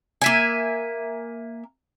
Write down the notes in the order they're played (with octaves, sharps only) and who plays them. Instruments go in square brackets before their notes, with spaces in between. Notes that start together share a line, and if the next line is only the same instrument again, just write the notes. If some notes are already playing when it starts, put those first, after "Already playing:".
[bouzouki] A#3 E5 G#5